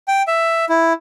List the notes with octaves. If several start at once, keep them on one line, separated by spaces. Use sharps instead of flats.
G5
E5
E4